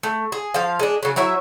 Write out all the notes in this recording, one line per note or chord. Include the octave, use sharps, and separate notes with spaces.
A3
G#4
F3 F5
G#3 D4
C#3 F#3
F#3 E4 C#5 E5